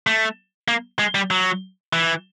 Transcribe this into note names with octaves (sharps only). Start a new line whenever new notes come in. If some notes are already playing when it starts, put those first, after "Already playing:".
A3
A#3
G#3
G3
F#3
E3